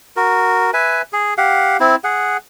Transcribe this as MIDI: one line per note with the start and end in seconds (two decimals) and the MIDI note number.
0.16 0.71 66
0.16 0.71 70
0.73 1.02 71
0.73 1.02 76
0.73 1.02 80
1.13 1.34 68
1.37 1.77 67
1.37 1.77 77
1.37 1.77 78
1.80 1.96 60
1.80 1.96 64
2.04 2.37 68
2.04 2.37 78